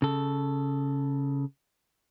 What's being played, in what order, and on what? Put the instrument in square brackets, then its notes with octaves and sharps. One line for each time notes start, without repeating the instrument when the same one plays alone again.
[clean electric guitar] C#3 A4